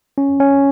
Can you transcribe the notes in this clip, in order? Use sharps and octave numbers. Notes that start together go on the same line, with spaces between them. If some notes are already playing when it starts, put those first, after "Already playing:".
C#4
C#4